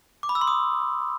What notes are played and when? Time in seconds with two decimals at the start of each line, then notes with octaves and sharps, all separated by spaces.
0.23 D6
0.29 B5
0.35 E6
0.41 C6
0.48 D#6